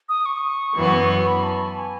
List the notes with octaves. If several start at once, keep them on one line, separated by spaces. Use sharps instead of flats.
D#6
C#6
F#2 E3 B3 F#4
B5
A5
A5
G#5